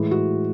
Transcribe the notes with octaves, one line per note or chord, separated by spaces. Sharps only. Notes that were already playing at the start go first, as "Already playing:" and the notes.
Already playing: A2 E3 G#3
F#4